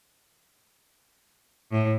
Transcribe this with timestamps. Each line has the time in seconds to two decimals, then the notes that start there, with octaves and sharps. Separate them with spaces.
1.72 A2